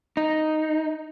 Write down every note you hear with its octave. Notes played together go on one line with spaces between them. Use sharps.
D#4